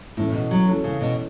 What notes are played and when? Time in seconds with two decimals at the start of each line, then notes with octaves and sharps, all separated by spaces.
0.17 A2 E3 C#4 A4 C#5
0.34 B2
0.51 F#3
0.67 E3 C#4 A4 C#5
0.84 C#3
1.01 B2